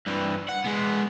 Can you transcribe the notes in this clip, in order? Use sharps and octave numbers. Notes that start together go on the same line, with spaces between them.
G2 E3
F#5
G#3 B3